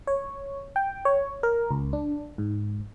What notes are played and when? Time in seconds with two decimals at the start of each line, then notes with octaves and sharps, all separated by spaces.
0.07 C#5
0.76 G5
1.05 C#5
1.43 A#4
1.71 C#2
1.93 D4
2.38 G#2